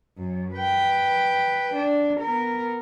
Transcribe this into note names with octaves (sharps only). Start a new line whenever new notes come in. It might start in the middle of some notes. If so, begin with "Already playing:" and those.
F#2
B4 G5
D4
B3 A#4